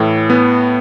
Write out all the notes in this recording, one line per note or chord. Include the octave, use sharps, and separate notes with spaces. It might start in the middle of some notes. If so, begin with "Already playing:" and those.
Already playing: A2 E3
B3